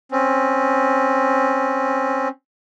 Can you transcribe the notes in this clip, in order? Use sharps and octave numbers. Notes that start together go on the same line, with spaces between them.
C4 C#4